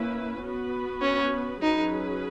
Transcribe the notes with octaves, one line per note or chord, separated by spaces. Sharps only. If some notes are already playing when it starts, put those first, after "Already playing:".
Already playing: A#3 C#4 E4 B4
B3 F#4 B4
C#4
F#3 C#4 D#4 G#4 B4